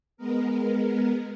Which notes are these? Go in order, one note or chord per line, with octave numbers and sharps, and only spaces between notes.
G#3 B3 A#4